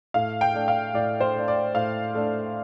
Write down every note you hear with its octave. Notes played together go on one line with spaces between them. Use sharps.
A2 F5
G5
A3 D4
F5
A2 D5
C5
A3 D4
D5
A2 F5
A3 D4